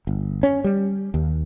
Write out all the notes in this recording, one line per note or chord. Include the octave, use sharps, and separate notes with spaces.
G1
C#4
G3
D#2